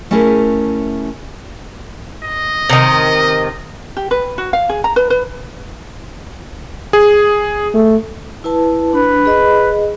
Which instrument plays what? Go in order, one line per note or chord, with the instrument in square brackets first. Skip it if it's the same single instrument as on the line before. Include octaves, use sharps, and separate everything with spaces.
[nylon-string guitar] A3 C#4 E4 G#4 A#4
[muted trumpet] D#5
[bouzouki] C3 D#3
[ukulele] G4
B4
F#4
F5
G#4
A#5
B4
B4
[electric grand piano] G#4
[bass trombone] A3
[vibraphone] E4 B4 A5
[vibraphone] D4 [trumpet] B4
[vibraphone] G#4 D#5